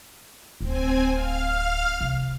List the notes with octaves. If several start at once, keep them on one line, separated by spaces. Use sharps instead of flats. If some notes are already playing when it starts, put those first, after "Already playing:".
D1 C4 G#5
F5 F6
C3